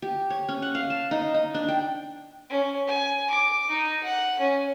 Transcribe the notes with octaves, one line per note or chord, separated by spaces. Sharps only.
G4
C#5
C#4
F#5
F5
A5
D#4
D#4
D4
G5
C#4
G#5
D6
D#4
F#5
C#4